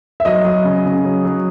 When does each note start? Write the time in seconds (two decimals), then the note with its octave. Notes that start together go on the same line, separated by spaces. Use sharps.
0.20 E5
0.25 F#3 D#5
0.45 F#3
0.65 C#3
0.85 C#3
1.05 F#3
1.25 F#3